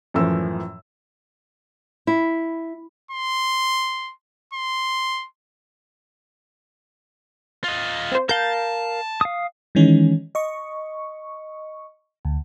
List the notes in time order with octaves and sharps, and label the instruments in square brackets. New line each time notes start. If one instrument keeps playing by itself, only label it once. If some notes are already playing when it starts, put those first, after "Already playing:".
[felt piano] F#2 A2 E3 F3 E6
[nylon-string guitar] E4
[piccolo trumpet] C6
C6
[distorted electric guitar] F4 D#5
[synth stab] C4 C5
[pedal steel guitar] A#4 F5 [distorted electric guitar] A5 [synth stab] G6
[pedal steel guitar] F5 D#6
[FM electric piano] D#3 E3 G#3 C#4 D#4
D#5 C#6
D2